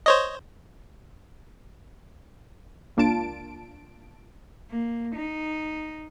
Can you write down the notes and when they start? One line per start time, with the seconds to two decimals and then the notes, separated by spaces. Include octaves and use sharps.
0.06 C5 C#5 D#5
2.97 C#2 A#3 D4 F4 A5 D7
4.71 A#3
5.15 D#4